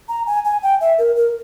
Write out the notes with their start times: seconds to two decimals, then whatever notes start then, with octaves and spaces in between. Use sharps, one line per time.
0.09 A#5
0.27 G#5
0.45 G#5
0.63 G5
0.81 E5
0.98 A#4
1.16 A#4